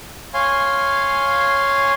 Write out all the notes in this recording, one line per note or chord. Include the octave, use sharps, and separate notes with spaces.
C#5 F5 G#5 C6